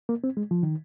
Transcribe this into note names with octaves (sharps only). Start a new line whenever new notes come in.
A#3
C4
G#3
F3
D#3